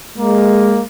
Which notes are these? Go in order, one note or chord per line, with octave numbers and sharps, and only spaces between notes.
G#3 A#3